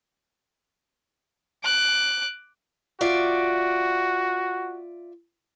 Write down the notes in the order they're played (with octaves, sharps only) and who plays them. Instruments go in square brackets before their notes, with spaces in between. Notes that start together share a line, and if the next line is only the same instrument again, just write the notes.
[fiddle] D6 F#6
[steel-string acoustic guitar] F4 D5 E5 [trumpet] F#4